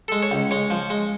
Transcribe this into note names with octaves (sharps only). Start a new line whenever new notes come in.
G#3 A4
C#5
C#2
G#3 C#5
F3
G#3